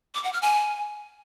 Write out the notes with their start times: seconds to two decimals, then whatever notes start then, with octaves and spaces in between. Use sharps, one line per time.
0.15 D6
0.24 F#5
0.33 F6
0.42 G#5